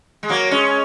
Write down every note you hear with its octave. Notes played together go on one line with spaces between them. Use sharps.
G#3
F#3 A#3
G#3 C#4